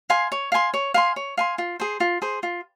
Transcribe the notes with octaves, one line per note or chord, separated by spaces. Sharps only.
F5 G#5 C6
C#5
F5 G#5 C6
C#5
F5 G#5 C6
C#5
F5 G#5 C6
F4
G#4 C5
F4
G#4 C5
F4